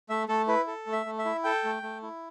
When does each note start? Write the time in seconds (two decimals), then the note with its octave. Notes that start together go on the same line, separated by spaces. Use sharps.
0.09 A3 E5
0.29 A3 A4
0.48 E4 B4
0.67 A4
0.87 A3
0.93 E5
1.06 A3
1.19 E5
1.25 E4
1.44 A4 G5
1.64 A3
1.83 A3
2.03 E4